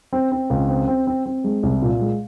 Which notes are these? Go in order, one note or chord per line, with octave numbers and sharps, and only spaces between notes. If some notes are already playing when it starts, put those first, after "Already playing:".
C4
C4
C#2
C4
C4
C4
C4
G#3
C2
A#2
G#3